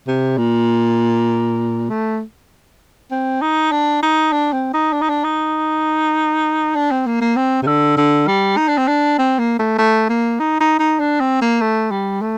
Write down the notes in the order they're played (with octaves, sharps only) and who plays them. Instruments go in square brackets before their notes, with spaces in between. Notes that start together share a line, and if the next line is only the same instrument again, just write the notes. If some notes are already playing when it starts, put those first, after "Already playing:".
[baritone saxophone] C3
A#2
A3
C4
D#4
D4
D#4
D4
C4
D#4
D4
D#4
D4
D#4
D4
C4
A#3
A#3
C4
C3
D3
D3
G3
D#4
D4
C4
D4
C4
A#3
A3
A3
A#3
D#4
D#4
D#4
D4
C4
A#3
A3
G3
A3